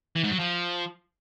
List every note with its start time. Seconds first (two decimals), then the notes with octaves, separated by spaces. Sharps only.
0.16 E3
0.24 G#2
0.31 F#3
0.39 F3